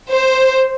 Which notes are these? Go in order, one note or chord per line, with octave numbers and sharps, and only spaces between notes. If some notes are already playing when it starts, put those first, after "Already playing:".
C5